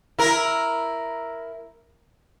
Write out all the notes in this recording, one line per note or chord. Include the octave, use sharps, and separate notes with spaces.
E4 A#4